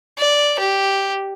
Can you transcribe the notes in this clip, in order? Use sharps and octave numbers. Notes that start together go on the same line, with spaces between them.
D5
G4